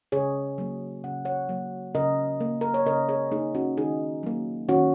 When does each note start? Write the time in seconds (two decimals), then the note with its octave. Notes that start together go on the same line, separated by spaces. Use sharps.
0.12 C#3 G#4 C#5
0.58 F#3 A#3
1.04 C#3 F#5
1.25 C#5 F#5
1.49 F#3 A#3
1.95 C#3 A#4 D#5
2.41 A#3
2.61 A#4
2.74 C#5
2.86 C#3 A#4 D#5
3.09 G#4 C#5
3.32 A#3 D#4 G#4
3.55 C#4 F#4
3.77 D#3 D#4 G#4
4.23 F#3 A#3
4.69 D#3 C#4 F#4